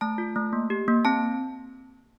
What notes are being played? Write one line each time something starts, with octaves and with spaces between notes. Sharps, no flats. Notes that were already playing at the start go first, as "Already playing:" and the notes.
A3 A5
F4
A3
A#3
G4
A#3
C4 A5